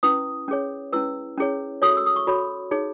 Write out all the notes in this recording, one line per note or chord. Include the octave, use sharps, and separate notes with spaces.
C#4 E4 B4 D#6
C#4 G#4 C#5
C#4 E4 B4 E6
C#4 E4 G#4 C#5
F#4 A4 C#5 D#6
E6
D#6
C#6
F#4 A4 C#5 B5
D#4 G#4 C#5